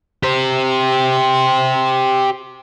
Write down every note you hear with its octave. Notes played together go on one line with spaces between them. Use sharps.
G4 C5